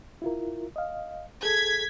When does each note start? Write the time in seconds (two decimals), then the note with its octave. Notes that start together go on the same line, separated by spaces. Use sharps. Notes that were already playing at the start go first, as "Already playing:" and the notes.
0.22 E4 F4 A#4
0.76 D#5 F5
1.43 G#4 A4 G#6 B6